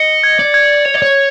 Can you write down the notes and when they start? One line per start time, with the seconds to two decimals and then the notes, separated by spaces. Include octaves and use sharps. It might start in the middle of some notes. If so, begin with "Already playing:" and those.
Already playing: D#5 C#7
0.24 G#6
0.40 D5
0.54 G#6
0.85 C#5 F7
0.94 D5
1.02 C#5